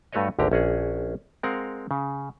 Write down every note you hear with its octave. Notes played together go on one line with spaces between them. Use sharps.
G2 A3 F#4 B4 C#5 D#5
G#1 D2 D3 G4 A#5
A#1 C#4 F#4 G#4
G#3 C4 A#4 F5 F#5 A#5
C#3